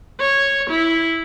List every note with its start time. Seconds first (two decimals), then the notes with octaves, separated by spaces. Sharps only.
0.20 C#5
0.70 E4